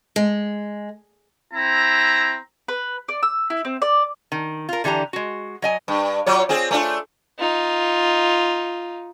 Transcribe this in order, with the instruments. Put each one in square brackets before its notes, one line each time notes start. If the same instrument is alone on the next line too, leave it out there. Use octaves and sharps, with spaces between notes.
[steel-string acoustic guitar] G#3
[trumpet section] C4 E4 A#5
[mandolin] B4
D5
E6
E4
C4
D5
[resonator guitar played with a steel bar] D#3
F4 A#4
D3 E3 D4 G4 A#5
G#3 F#4
F#3 D#5 G#5
[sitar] G2
F#3 F4 C#5
C4 F4 G#4
A3 D4 F4
[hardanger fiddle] D#4 F4